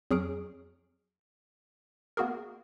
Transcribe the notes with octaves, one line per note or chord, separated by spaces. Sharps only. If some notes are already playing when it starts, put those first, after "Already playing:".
F2 F#3 G#4 C#6 F6 D7
A#3 B3 F#4 G#4 A#4